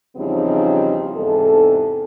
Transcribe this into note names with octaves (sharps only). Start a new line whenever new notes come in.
E2 C#3 F3 G3 C4 D#4
E2 G#2 C3 A4